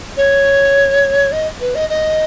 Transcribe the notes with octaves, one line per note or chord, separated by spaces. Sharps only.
C#5
D#5
B4
D#5
D#5